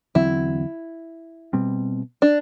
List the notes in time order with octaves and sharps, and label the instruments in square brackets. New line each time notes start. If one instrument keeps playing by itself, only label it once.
[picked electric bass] E2 D3 F#3 C4 [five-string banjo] E4
[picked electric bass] B2 G3 C4
[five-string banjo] D4